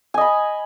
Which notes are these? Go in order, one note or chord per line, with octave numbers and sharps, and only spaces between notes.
D#5 G#5 B5